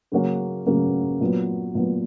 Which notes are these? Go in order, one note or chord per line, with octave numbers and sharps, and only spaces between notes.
C#3 F#3 A#3 C#4 F#4
C#3 F#3 A#3 C#4 F#4
A#2 F#3 B3
A#2 F#3 B3